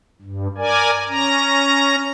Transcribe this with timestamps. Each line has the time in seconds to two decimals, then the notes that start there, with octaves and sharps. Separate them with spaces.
0.22 G2
0.58 A#4 D5 G#5
1.09 C#4 A#5